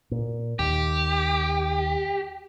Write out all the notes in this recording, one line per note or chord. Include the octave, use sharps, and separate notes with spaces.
A#2
D#2 G4